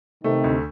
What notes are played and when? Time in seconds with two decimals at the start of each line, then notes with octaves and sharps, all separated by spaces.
0.24 C3 D#3 A3
0.44 D2